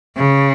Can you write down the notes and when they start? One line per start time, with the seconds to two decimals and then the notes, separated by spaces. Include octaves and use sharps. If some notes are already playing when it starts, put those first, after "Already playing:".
0.17 C#3